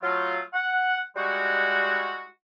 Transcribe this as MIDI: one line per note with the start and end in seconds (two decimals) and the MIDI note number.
0.03 0.40 54
0.03 0.40 57
0.03 0.40 65
0.53 1.00 78
1.16 2.25 55
1.16 2.25 56
1.16 2.25 63
1.16 2.25 64
1.16 2.25 66